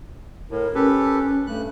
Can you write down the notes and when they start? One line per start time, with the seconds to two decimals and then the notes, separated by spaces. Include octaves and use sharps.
0.51 A2 A#4
0.75 C#4 G4 A4 B4
1.47 G2 A3 F#6